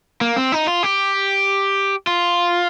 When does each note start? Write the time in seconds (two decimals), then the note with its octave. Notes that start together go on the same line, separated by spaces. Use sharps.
0.21 A#3
0.36 C4
0.52 D#4
0.67 F4
0.83 G4
2.07 F4